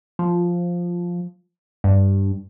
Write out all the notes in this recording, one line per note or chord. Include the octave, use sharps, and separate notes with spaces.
F3
G2